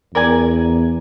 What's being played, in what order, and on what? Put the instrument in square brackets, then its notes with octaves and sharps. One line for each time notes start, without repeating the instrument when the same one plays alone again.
[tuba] E2 [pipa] A#4 D5 G#5